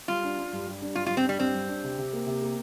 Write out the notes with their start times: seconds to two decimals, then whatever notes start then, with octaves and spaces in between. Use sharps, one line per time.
0.08 G3 F4
0.24 D4
0.38 D4
0.53 G2
0.67 G3
0.81 D4
0.95 G2 F4
1.06 F4
1.10 G2
1.17 C4
1.24 G3 D4
1.39 G2 C4
1.54 G3
1.69 D4
1.84 C3
1.98 C3
2.13 A#3
2.26 C3
2.42 A#3